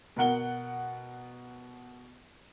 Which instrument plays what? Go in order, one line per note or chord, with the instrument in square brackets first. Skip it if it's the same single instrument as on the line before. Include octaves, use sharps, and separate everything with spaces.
[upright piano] B2 A#4 F#5 G7